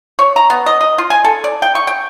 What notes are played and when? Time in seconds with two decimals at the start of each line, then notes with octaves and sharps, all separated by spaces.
0.19 C#5
0.36 A#5
0.50 B3
0.66 D#5
0.81 D#5
0.98 F4
1.10 G#5
1.24 A4
1.44 D5
1.62 G5
1.75 C#6
1.87 G5